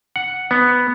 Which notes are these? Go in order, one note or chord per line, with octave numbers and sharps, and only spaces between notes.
F#5
B3